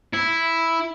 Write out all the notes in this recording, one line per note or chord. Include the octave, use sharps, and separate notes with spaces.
E4